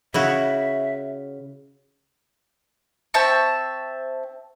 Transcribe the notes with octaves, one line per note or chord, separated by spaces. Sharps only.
C#3 E4 F#4 E5
C4 E5 A5 C#6